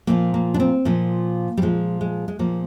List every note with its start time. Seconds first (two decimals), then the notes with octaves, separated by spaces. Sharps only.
0.07 A#2 F3 A#3
0.34 A#3
0.54 D4
0.60 C4
0.85 A#2 F3 A#3
1.57 G3
1.62 A#2 F3 G#3
2.01 G#3
2.28 G#3
2.39 A#2 F3 A#3